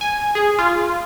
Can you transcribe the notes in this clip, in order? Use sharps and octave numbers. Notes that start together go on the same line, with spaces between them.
G#5
G#4
F4